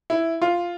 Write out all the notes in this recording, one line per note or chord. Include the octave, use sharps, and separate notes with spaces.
E4
F4